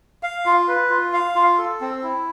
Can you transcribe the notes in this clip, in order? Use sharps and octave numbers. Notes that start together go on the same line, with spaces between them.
F5
F4
B4
F4
F5
F4
A4
C4
E4